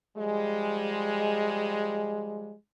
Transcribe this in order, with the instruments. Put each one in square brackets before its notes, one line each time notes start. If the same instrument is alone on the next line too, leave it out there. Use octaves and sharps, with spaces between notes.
[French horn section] F3 G3 G#3